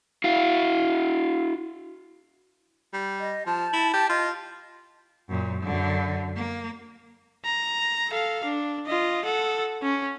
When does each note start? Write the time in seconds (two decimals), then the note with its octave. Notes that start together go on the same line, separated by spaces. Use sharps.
0.24 E4 F#4 F5
2.93 G3
3.20 D#5
3.46 F3 A5
3.73 E4
3.93 G4
4.10 F4 D#5
5.29 F#2 A#2
5.64 F#2 D3
6.37 A#3
7.45 A#5
8.10 A4 F5
8.45 D4
8.86 F4 D#5
9.25 A4 F#5
9.82 C#4